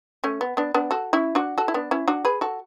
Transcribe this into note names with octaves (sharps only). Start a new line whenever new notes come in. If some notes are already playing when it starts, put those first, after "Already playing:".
A3 C#4
B3
B3 D4
B3 D4
F#4 A4
C#4 E4
D4 F#4
F#4 A4
E4
B3 D4
C#4 E4
D4 F#4
G#4 B4
F#4 A4